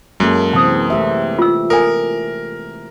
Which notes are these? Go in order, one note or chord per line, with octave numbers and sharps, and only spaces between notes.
F#2 G#3 A#3 A4
C3 E3 C4 A5 D#6
A3 G4 E5
F4 E6
A4 A#4 G#5